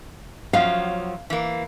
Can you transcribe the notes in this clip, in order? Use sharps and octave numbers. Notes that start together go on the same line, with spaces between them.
F#2 F3 F#3 F5
E3 A#3